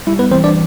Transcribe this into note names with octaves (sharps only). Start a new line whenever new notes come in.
G3 E4
B3 B4
E3 C4 C5
D4 D5